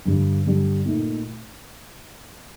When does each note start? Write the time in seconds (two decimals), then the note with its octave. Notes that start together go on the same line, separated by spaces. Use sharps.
0.06 G2 D3 G3 D4
0.45 G2 D3 G3 D4
0.85 A#2 A3 D#4